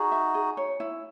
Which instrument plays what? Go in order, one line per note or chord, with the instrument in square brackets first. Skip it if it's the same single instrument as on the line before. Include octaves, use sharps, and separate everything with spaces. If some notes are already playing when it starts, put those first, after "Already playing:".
Already playing: [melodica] D#4 F#4 [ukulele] G#4
[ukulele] E5
G#4
C#5
E4